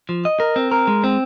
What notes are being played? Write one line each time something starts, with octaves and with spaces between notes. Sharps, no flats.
F3
D#5
A#4
C4
A#4
G#3
C4